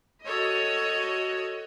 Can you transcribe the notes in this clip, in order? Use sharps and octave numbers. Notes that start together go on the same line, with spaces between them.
F#4 A4 C#5 D#5